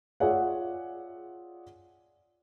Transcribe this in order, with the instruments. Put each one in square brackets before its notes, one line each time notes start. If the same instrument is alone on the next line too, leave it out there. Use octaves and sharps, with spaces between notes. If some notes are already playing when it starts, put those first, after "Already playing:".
[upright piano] F4 G#4 C#5 D5 E5 F#5